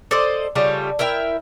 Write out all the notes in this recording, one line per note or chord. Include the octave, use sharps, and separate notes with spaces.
A4 C5 D5 D#5
C#3 G3 A3 F4
E4 A#4 E5 G5